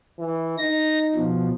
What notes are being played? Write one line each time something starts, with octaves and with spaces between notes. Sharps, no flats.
E3
D#4 A#6
B2 F3